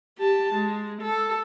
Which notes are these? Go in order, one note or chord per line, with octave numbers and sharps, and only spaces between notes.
G4 A5
G#3
A4